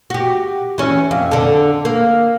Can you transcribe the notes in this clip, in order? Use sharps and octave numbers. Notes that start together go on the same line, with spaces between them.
F#4 G4
E3 C#4
F2
D3 A4
A#3